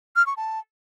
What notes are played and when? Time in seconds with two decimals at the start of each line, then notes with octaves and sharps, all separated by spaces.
0.16 F6
0.27 C#6
0.37 A5